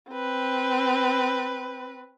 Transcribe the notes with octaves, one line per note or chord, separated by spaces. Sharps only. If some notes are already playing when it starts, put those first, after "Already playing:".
C4 B4